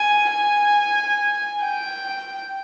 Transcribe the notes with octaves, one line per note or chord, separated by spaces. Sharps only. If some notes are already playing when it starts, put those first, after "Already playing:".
Already playing: G#5
G#5
G5